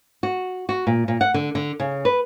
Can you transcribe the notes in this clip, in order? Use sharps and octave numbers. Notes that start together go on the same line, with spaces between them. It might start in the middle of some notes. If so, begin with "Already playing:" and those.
F#4
F#4
A#2
A#2
F#5
D3
D3
C#3
B4